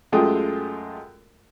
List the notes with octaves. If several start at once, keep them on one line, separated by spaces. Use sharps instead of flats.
F#2 G#3 A3 F4 G5 D#6